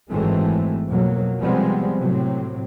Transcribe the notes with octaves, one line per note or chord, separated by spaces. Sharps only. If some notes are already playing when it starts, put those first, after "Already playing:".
G#1 F#2 E3 G#3 A3 C4
F2 B2 F#3 A#3
C3 F3 G3 G#3 B3 C4
A2 C3 F#3 C4